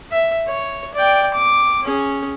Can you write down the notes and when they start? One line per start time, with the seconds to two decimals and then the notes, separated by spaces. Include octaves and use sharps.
0.12 E5
0.48 C#5
0.94 D5 G5
1.34 D6
1.83 C#4 G#4